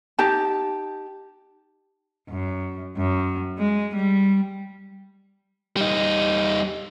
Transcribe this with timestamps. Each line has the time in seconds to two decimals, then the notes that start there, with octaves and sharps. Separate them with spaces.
0.19 D#4 G4 A5
2.29 F#2
2.97 F#2
3.58 G#3
3.95 G3
5.76 G3 D#4